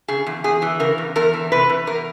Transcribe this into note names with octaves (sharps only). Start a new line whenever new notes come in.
C#3 G#4
E2
E2 G#4
E3
C#3 A#4
E2
E2 A#4
E3
C3 B4
E2
E2 A#4